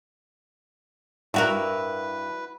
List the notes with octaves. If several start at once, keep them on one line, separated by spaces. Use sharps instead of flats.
G2 E4 F#4 A#4 B4